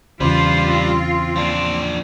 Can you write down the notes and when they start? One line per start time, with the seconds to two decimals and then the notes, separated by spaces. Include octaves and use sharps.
0.20 E2 C#3 G3 F4 B4 C5
0.66 C4
1.36 F3 D4